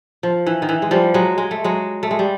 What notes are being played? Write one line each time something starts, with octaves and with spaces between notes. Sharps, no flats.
F3
E3
D#3
E3
G#3
F3 G3
F#3 G#3
G#3
A3
F#3 G#3
A3
G#3
G3